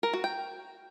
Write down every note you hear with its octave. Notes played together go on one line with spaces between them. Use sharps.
A#4
F#4
G5